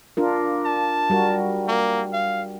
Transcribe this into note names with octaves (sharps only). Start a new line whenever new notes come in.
D4 F4 A#4
A5
G3 F#4 A#4
A#3
F5